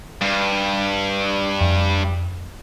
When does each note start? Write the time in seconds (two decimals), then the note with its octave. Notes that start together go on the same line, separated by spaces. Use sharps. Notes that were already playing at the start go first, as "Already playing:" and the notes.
0.21 G2
1.61 F2